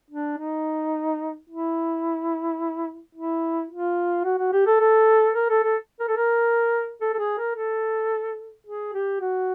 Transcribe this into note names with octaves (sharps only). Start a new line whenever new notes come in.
D4
D#4
E4
E4
F4
F#4
F#4
G4
A4
A4
A#4
A4
A4
A#4
A4
A#4
A4
A4
G#4
A#4
A4
G#4
G4
F#4